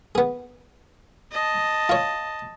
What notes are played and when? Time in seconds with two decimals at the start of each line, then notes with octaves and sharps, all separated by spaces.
0.15 B3 G#4
1.32 D#5 A5
1.89 F4 C#5